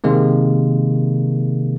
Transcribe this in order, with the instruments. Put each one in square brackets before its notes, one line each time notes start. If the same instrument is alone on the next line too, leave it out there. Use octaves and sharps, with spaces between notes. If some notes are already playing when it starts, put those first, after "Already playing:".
[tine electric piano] C3 D#3 G#3 A#3